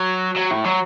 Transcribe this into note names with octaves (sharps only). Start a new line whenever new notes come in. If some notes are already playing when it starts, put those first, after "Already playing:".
Already playing: F#3
F#3
A2
F#3